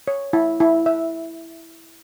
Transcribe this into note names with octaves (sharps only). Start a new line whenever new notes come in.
C#5
E4
E4
E5